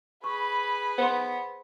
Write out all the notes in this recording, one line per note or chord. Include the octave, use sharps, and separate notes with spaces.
G#4 B4 B5 C#6
B3 C5 C6